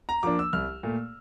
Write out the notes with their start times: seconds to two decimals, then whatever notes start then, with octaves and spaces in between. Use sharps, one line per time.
0.09 A#5
0.23 F3 A#3 D4 D6
0.39 E6
0.53 C2 F6
0.83 A#2 A3